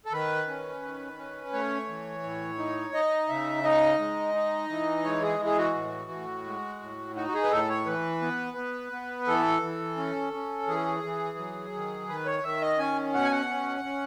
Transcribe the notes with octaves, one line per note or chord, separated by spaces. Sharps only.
A4
D#3 B4
C#4
D#3
C#4
A3 C#5
E3
A2
D#4
D#4 D#5
C#3 E5
D#4 D#5
G#3
D#4
E3
G#3 C#5
G#4
E3
G#4
F#4
A2
A2
G#3
A2
D#4 F#4
F#4
G#4
B4
A2 A4
C#5
E3 B4
B3
B3
B3
E3 A4
E3
C#4
C#4
E3 G#4
E3
F#3
D#3
D#3 B4
C#5
D#3 E5
D#5
C#4 G#5
B2 F#5
G#5
F#5
C#4
C#4